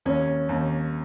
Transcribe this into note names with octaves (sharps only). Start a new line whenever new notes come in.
D#2 C#4
D#2